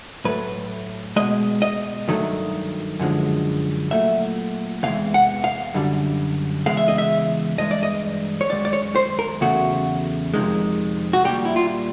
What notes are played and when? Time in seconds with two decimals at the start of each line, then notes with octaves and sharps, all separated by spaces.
0.25 A2 F#3 A3 B4
1.16 B2 G#3 D#5
1.62 D#5
2.08 G2 D#3 F#3 A3
2.99 F#2 D3 F3 G#3
3.91 A#2 F#3 A3 E5
4.83 E2 C3 E3 G#3 F5
5.14 F#5
5.44 F5
5.74 F#2 D3 G3
6.66 E2 C#3 E3 G#3 F5
6.77 E5
6.88 D#5
6.98 E5
7.58 G2 E3 G#3 D#5
7.71 D5
7.83 D#5
8.41 C#5
8.50 F#2 D#3 G#3 D5
8.65 D5
8.73 C#5
8.96 C5
9.19 A#4
9.41 E2 C#3 F#3 A3 F#4
10.34 F2 C3 D#3 G#3
11.13 F#4
11.24 A#2 G3 G4
11.45 E4
11.56 F4